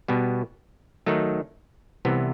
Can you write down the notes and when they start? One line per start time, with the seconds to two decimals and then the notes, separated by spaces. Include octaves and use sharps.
0.08 B2 G3 B3
1.06 D#3 F#3 A3 D#4
2.05 C2 C3 E3 B3